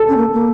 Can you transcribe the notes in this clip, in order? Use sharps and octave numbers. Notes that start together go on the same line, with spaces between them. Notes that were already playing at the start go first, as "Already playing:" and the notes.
Already playing: A4
C#4
A#3
A#3